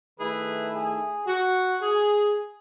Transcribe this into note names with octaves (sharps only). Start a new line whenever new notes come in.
D#3 A3 E4 G#4 B4
G#4
F#4
G#4